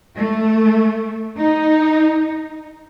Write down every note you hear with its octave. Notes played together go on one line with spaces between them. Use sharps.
A3
D#4